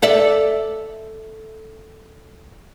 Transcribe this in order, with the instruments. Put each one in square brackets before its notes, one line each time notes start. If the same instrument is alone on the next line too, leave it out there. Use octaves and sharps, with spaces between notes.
[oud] A4 D5 E5